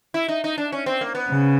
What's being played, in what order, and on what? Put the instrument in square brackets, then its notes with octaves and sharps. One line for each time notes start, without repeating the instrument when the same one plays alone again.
[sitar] E4
D#4
D#4
D4
C#4
C4
A#3
B3
[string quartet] C#3